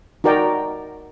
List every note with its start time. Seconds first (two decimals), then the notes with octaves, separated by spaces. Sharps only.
0.24 D#4 F#4 A#4 D5 G5